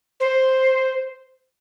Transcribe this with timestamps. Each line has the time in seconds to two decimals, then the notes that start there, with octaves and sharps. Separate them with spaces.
0.20 C5